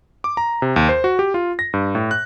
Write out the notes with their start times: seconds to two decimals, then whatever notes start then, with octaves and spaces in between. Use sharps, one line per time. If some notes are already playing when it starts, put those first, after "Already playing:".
0.24 D6
0.37 A#5
0.62 C3
0.76 D#2
0.89 C5
1.04 F#4
1.19 G4
1.34 F4
1.59 A#6
1.74 G2
1.95 A2
2.11 F#6